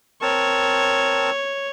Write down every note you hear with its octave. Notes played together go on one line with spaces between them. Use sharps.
C4 A#4 C#5 A5